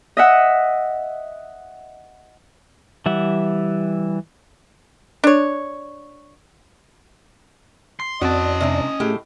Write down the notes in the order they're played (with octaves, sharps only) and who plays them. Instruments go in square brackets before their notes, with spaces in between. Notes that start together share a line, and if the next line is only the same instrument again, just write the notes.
[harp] D#5 E5 F#5
[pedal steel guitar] E3 G3 E5 F#5
[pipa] D4 C#5
[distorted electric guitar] C6
[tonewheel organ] F2 D5 [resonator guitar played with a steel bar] C4 F#4 [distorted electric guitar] C#4 A5 [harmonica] D#5
[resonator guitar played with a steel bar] C3 G#3 D4
[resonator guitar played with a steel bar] A2 G4 [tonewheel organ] A3 G#4